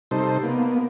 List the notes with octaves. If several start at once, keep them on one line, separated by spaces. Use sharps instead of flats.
C3 G3 D#4 A4 C5
A#3 B3